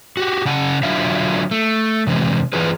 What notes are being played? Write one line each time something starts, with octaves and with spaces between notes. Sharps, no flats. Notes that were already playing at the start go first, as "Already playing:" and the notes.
F#4 G4
C#3 C#4 F#5 A5
D3 F#3 D4 F4 E5 F5
A3
C3 E3 G3 G#3 C4
E3 F4 G#4 B4